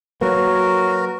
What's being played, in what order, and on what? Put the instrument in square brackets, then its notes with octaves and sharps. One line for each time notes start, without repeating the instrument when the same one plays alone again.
[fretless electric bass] F#3 A#3 [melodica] F#4 A#4 [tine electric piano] B4 C#5